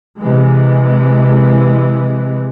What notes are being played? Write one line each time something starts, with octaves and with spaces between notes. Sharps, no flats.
C3 E3 G#3